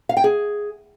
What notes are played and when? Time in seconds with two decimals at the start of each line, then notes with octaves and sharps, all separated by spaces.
0.09 F5
0.17 G5
0.24 G#4